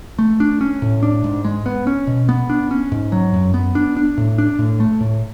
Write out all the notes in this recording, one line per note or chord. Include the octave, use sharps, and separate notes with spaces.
A3
D4
C#4
A2
D4
G#2
G#3
B3
C#4
B2
B3
D4
C#4
G#2
F#3
F#2
B3
D4
D4
A2
D4
A2
A3
A2